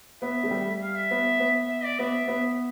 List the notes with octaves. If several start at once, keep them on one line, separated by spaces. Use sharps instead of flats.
B3 E5
A3
G3
F5
E5
B3
B3
E5
D5
B3 E5
B3